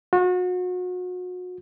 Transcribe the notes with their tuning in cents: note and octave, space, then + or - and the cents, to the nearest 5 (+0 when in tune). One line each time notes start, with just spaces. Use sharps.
F#4 -35